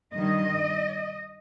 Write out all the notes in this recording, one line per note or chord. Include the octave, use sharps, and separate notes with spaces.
G2 D#3 G3 D#5